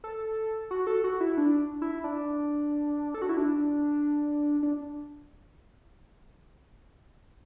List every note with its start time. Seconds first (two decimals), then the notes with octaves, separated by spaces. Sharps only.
0.04 A4
0.71 F#4
0.87 A4
1.04 F#4
1.20 E4
1.37 D4
1.82 E4
2.04 D4
3.14 A4
3.22 F#4
3.29 E4
3.37 D4
4.63 D4